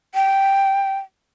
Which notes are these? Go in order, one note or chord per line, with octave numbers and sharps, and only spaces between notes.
G5